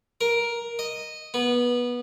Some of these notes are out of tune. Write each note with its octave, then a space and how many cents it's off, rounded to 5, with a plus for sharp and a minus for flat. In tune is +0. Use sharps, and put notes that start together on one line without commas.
A#4 +10
D#5 -5
B3 -20